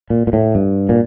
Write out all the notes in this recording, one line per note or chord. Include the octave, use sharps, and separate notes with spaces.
A#2
A#2
A2
G2
A#2